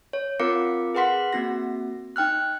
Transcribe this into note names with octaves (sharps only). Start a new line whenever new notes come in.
C#5
C4 F4 A#4 F5 D6 C#7
G#4 B4 F#5 C6 B6
A#3 C4 F#4 A#6
D#4 G5 F6 F#6